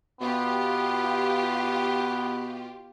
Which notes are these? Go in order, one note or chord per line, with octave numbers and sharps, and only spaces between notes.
B2 B3 F4 G4